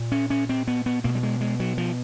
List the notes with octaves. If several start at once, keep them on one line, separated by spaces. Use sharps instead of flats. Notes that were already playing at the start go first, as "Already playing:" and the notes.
Already playing: A#2
C#4
C#4
C4
B3
B3
B2 A#3
G3
G#3
G#3
F#3
F3